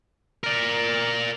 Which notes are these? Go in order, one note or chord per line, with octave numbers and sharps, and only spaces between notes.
A#4 D5